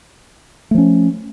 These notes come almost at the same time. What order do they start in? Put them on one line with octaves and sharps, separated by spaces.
A3 F3 C#4